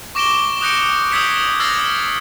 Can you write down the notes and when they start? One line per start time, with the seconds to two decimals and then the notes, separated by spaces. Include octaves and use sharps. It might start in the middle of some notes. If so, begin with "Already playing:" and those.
0.15 C#6 D6 A#6 D7 E7 G7
0.61 D#6 F#6 G6 A#6 C#7 D7
1.12 D#6 E6 G6 G#6 B6 C#7
1.60 E6 F6 G6 A6 A#6 C7